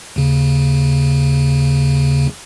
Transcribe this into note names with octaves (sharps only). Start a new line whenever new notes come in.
D#2 C#3